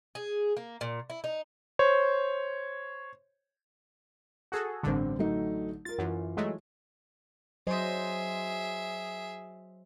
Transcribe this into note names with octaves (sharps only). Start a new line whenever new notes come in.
G#4
A#3
A#2
E4
D#4
C5 C#5
F#4 G#4 A4
A1 G2 D3 C4
F#3 A3 D#4
F4 A#4 A6
F#2 E3 F4
F#3 G#3 A3
F#3 G#4 C5 D#5 E5